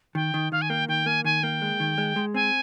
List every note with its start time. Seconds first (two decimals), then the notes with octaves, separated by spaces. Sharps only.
0.15 D#3 G5
0.34 D#3
0.52 D#3 F5
0.62 G#5
0.70 A#3 G5
0.88 D#3 G5
1.06 A#3 G#5
1.24 D#3 G#5
1.43 A#3 G5
1.62 G#3
1.80 D#3
1.98 G#3
2.16 G#3
2.34 C4 G#5